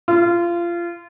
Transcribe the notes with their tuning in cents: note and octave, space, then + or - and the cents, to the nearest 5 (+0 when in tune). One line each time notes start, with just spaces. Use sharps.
F4 -25